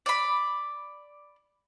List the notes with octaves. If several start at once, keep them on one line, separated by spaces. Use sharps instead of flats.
D5 B5